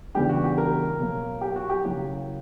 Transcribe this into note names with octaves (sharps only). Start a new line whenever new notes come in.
E2 C#3 G3 B3 D4 G4
F#4
G4
A#4
B2 F#3 A#3
G4
F#4
G4
C#3 F#3 A#3 E4